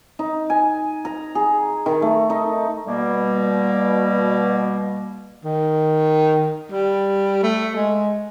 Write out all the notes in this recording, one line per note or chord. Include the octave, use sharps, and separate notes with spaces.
D#4
G#5
A#5
G#4
D#3
A3
D#4
B2 G3 A#3
D#3
G3
A3
G#3